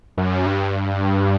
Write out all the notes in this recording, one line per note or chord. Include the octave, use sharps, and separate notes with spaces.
F#2
G2